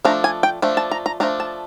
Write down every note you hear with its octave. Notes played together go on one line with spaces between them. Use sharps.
F3 A3 D4 A#5
G#5
G5
F3 A3 D4
A5
A#5
A#5
F3 A3 D4 A#5
A5